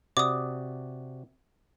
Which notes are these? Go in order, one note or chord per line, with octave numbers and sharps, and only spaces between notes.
C3 F#4 D5 D6 D#6